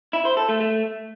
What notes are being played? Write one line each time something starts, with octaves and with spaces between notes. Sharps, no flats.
E4
C5
A4
A3
A3